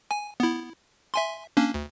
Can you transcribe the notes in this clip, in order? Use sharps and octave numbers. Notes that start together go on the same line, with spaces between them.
G#5
B3 E4
E5 G#5 C6
A#3 C#4 D4
D2